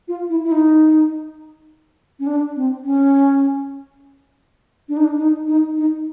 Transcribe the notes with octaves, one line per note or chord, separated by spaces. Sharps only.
F4
E4
E4
D#4
C#4
D4
C4
C#4
D4
D#4
D4
D#4
D#4
D#4